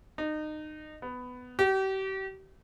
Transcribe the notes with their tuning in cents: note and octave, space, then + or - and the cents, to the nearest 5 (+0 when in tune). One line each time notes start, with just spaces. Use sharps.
D#4 -25
B3 +10
G4 -35